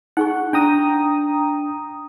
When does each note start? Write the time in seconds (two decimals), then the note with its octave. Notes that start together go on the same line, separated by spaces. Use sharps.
0.17 D#4 G#4 F#5 C#6
0.53 D4 G5 A#5 D#6